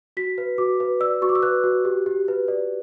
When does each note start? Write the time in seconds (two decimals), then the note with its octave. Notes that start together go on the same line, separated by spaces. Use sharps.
0.17 F#4 B6
0.38 B4
0.58 F#4 D6
0.80 B4
1.00 D5 E6
1.22 F#4 C#6
1.29 D6
1.35 E6
1.43 B4 F#6
1.64 F#4
1.85 G4
2.06 G4
2.28 B4
2.48 D5